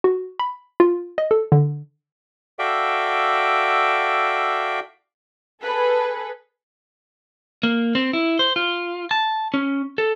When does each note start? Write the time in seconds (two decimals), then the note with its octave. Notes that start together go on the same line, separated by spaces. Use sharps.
0.04 F#4
0.39 B5
0.80 F4
1.18 D#5
1.31 A4
1.52 D3
2.59 F#4 A4 D5 E5 F5 G5
5.62 G#4 A4 B4
7.63 A#3
7.95 C4
8.13 E4
8.39 C5
8.56 F4
9.11 A5
9.54 C#4
9.98 A4